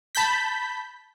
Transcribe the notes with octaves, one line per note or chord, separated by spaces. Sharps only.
A5 B5 G6 B6